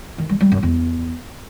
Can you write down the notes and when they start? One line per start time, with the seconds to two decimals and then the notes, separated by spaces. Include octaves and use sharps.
0.18 D#3
0.29 G3
0.40 G3
0.52 F#2
0.63 E2